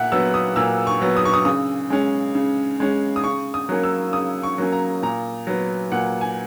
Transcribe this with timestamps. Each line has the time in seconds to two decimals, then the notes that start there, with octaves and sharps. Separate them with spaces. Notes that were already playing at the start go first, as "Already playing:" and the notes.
Already playing: A#2 E5 F#5
0.12 F#3 B3 E6
0.34 D#6
0.56 A#2 E6
0.87 C#6
1.01 F#3 B3
1.17 D#6
1.25 C#6
1.34 D#6
1.45 C#3 D#6
1.90 G#3 C#4
2.35 C#3
2.80 G#3 C#4
3.16 D#6
3.24 C#3 C#6
3.54 D#6
3.69 F#3 A#3 C#4
3.83 E6
4.13 C#3 D#6
4.43 C#6
4.58 F#3 A#3 C#4
4.72 A#5
5.03 A#2 A#5
5.47 F#3 B3
5.92 A#2 F#5
6.21 G#5